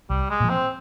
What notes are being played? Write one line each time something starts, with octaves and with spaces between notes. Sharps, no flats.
C2 G3
G#3
A#2 F3
C4